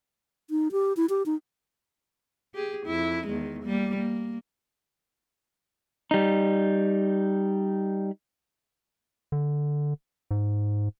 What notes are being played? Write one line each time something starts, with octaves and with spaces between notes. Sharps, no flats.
D#4
G4
E4
G4
D#4
G4 G#4
F2 E4
E2 D#3 G#3
G3 A#3
A#3
G3 D#4
D3
G#2